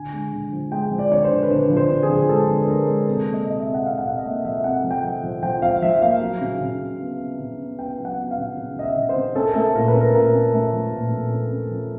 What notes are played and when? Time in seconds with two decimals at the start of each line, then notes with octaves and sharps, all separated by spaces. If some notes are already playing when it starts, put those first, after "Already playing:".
Already playing: D3 G#5
0.13 G#3
0.33 D3
0.52 F3
0.72 G#3 G5
0.91 F3
0.99 D5
1.11 D3 C#5
1.24 C5
1.30 D3
1.43 B4
1.51 D3 C5
1.70 F3
1.77 C5
1.90 D3
2.03 G#4
2.10 F3
2.29 G#3 A4
2.49 D3
2.59 B4
2.68 G#3 A#4
2.88 G#3
3.07 C3 A4
3.27 A#3
3.34 D#5
3.47 C3 D#5
3.60 E5
3.66 C3
3.74 F#5
3.86 C3 F5
3.98 F#5
4.05 C3 F5
4.17 D#5
4.25 A#3 E5
4.45 F3 E5
4.64 C3 F#5
4.84 F3
4.91 G5
5.04 F3
5.23 F3
5.43 F3 G5
5.62 F3 F5
5.82 F3 E5
6.02 A#3 F5
6.21 F#3
6.41 C#3
6.61 C#3
6.80 C#3
7.00 B3
7.20 B3
7.39 C#3
7.59 B3
7.78 B3 G5
7.98 F#3
8.05 F#5
8.18 B3
8.31 F5
8.38 C#3
8.57 C#3
8.77 C#3 D#5
8.83 E5
8.97 C#3
9.09 C5
9.16 C#3
9.36 C#4 A4
9.45 A#4
9.54 A3 A4
9.75 A#2 A#4
9.88 B4
9.94 C#4
10.00 A#4
10.14 A#2 A#4
10.34 C#4
10.54 A3
10.73 F3
10.93 A#2
11.12 A#2
11.32 C#4
11.52 C#4
11.71 F3